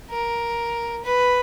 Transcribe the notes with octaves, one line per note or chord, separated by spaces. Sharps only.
A#4
B4